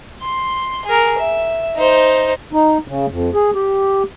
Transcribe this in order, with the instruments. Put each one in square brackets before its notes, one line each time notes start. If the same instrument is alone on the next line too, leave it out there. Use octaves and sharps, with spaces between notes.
[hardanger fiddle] C6
G#4 A#4
E5
D#4 C5
[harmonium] D#4
C#3
F2
G#4
G4